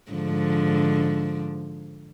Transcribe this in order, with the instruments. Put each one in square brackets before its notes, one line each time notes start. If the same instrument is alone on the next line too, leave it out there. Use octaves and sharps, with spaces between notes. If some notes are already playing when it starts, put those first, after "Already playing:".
[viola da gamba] G#2 D3 F3